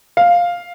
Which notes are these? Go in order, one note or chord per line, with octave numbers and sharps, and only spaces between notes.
F5